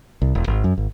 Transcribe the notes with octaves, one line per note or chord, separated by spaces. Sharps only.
C2
E1
G#1
F#2
G#1